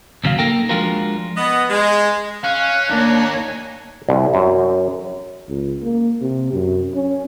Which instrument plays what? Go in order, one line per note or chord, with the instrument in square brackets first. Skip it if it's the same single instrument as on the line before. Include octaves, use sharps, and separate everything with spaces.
[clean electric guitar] D#2 C#3 F#3 F5
A#3 D#4 A4 A#4 G5
F3 G#3 D4 F4 F#4 A#4
[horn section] B3 D#5
G#3
[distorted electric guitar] C#4 [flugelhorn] F5 [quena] F#6
[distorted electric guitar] D#2 [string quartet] A#3 C#5 [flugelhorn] D4
[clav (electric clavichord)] G#5
C2
F#2
[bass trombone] C#2
A#3
C3
F#2
C#4